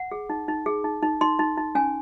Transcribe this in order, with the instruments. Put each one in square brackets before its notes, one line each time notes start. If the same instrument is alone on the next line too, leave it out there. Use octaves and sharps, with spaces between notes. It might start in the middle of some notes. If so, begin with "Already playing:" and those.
Already playing: [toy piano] F#5
G#4
D#4
D#4
G#4
D#4
D#4
D#4 C6
D#4
D#4
C#4 G#5